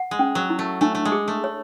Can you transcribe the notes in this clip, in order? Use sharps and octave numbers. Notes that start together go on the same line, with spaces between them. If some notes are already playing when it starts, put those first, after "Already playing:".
Already playing: F#5
G#3
C#4
F#3
E4
A3
A3 D4
A3
G#3
G#4
A3
C#5